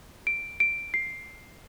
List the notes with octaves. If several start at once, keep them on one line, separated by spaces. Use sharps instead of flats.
D7
D7
C7